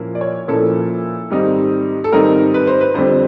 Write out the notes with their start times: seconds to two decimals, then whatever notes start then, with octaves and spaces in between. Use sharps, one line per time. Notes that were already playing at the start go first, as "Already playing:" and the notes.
Already playing: A#2 F3 A#3 C#4 E4
0.15 D5
0.21 C#5
0.48 A#2 F3 A#3 C#4 E4 A4
1.30 G#2 D#3 G3 C4 D#4
2.04 A4
2.12 G#2 D#3 G3 C4 D#4 A#4
2.54 B4
2.67 C5
2.81 B4
2.94 F2 D3 G3 C4 C5